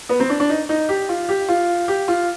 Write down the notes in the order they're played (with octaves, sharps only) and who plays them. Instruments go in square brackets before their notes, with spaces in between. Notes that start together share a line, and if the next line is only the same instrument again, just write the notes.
[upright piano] B3
C4
D4
D4
D#4
D#4
G4
F4
G4
F4
G4
F4